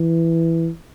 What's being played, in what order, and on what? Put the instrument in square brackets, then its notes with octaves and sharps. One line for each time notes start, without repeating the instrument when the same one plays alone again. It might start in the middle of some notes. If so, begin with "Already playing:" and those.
Already playing: [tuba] E3